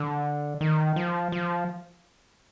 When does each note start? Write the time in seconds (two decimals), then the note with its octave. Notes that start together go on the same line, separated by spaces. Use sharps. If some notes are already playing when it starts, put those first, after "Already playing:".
Already playing: D3
0.61 D#3
0.96 F3
1.32 F3